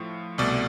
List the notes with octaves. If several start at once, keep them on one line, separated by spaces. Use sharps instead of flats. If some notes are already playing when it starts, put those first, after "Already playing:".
Already playing: A2 F3 A3
C2 B2 A3 D5